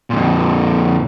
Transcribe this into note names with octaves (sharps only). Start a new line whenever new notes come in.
F2 A#2